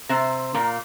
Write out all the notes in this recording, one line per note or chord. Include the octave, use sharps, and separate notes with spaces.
C3 C4
A#2 A#3